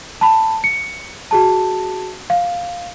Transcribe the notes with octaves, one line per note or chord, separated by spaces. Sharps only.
A5 B5
C#7
F#4 G#4 A5
F5